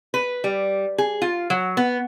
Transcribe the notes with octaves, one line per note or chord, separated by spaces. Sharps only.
B4
G3
G#4
F4
F#3
B3